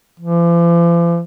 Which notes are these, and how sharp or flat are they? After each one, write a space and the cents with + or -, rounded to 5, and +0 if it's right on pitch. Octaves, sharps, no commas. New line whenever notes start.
F3 -45